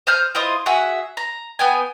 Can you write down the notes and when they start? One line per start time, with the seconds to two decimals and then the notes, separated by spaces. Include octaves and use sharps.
0.07 C5 D#6 F6 G6
0.35 E4 F4 C5 D#5
0.66 F#4 G#4 E5 F#5
1.17 A#5
1.59 B3 G5 G#5